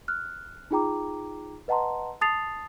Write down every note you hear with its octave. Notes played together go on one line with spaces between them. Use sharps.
F6 F#6
D#4 F4 G#4 G5 A#5 D6
B4 D#5 F#5 A5 A#5 C6
A5 D#6 A6 C7 F7